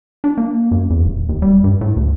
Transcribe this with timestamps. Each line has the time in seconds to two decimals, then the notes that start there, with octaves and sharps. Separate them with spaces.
0.24 D4
0.38 A#3
0.71 F#2
0.90 E2
1.05 D#1
1.29 D#2
1.42 G3
1.64 G2
1.81 A2
1.97 D2